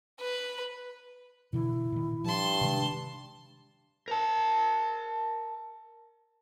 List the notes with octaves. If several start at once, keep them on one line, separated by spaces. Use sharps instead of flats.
B4
B2 D3 E3 E4
A#2 D#3
G2 F3 A5 C6
C3 D#3 G#3 D4
A#4 A5